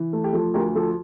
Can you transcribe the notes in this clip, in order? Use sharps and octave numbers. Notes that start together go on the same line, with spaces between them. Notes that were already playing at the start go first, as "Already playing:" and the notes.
Already playing: E3
A3
G4
F3 A4
D2 G4 A#4
F3 A4